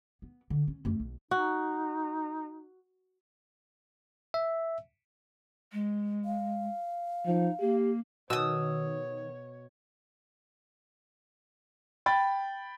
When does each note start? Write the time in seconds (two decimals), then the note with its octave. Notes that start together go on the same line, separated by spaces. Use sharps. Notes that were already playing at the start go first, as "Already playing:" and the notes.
0.22 B3
0.50 D3
0.68 C#4
0.85 F#2 A3
1.00 B1
1.31 D#4 F#4
4.34 E5
5.72 G#3
6.25 F5
7.26 F3 D#4
7.61 A#3 G4
8.30 B2 D#3 C#5 D#6 E6
12.06 G5 B5 A6